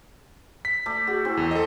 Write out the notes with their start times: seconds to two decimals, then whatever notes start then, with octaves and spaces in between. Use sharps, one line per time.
0.65 B6
0.86 A3 D5
1.07 F#4 G#4
1.25 C4 E4
1.37 E2
1.51 A4 D#5